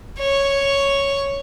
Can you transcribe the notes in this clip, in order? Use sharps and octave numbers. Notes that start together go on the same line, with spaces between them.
C#5